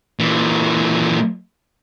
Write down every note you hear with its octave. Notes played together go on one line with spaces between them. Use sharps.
A#2 E3